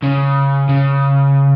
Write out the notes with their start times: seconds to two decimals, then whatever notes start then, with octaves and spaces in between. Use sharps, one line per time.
0.03 C#3
0.69 C#3